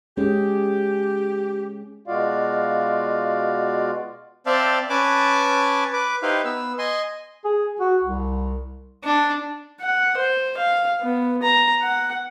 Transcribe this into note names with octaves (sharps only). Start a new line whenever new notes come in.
G#3 C#4 G4 G#4
B2 G#3 F4 F#4 D5 F5
C4 C5 D5 E5 F5 A5
C#4 B4 G#5 A5 D6
B4 D6
D#4 E4 G4 B4 C5 F5
B3 E6
D#5 G#5 C6
G#4
F#4
C2
D4
F#5
C5
F5
B3
A#5
F#5